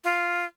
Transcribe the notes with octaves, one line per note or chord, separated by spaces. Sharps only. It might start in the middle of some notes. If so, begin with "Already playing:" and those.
F4